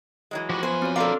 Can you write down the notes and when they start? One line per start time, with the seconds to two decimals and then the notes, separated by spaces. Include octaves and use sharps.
0.31 E3 F#3 G#3
0.50 F3 F#4 G4 B4
0.63 F#2 B3 C5 G#5
0.82 C4 F#4 C#5
0.96 D4 A4 A#4 D5 F5 C6 D6